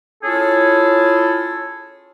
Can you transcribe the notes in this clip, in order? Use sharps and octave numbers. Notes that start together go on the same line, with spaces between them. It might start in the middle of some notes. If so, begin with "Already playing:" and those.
C#4 E4 F4 G#4 A4 C#5